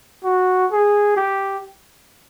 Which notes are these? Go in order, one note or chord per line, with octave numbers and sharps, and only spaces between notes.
F#4
G#4
G4